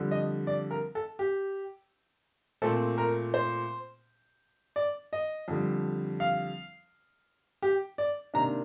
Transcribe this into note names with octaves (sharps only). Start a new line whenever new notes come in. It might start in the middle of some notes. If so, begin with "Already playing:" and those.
Already playing: F2 D3 G3
D#5
D5
A#4
A4
G4
A#2 A3 C4 A4
A#4
C5
D5
D#5
F2 D3 G3
F5
G4
D5
C3 D#3 A#3 D4 A#5